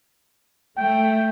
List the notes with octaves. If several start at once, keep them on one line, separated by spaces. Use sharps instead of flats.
A3 G5